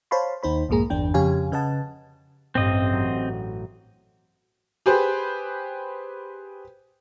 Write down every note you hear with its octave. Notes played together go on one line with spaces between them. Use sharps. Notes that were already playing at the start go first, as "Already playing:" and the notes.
C5 C#5 F5 A5 B5 C6
D#2 D#4 C5 B5
B1 F2 G#2 A#3 G#4 A#5
G1 E2 D4 G5
F2 C#3 G4 C#5 F5 G#5
C#3 B4 D#5 F#5 A5
A1 G2 C4 D#5
F#3
G4 G#4 B4 C5